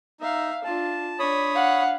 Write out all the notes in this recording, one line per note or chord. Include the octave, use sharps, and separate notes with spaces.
D#4 E5 F5
D4 F4 A5
D4 C#5 B5 D#6
F5 F#5